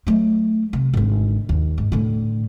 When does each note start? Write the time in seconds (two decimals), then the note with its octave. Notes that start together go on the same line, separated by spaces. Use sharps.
0.07 F#3 A3
0.73 C3
0.93 G#1 D3
1.49 D#2
1.78 G#2
1.92 A2 D3